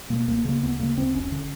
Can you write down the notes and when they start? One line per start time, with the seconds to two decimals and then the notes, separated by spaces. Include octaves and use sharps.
0.10 B2 A#3
0.28 C#2 A#3
0.45 C#3 A#3
0.63 D2 B3
0.79 C#3 A#3
0.98 D2 C4
1.14 F#1 C#4
1.32 D3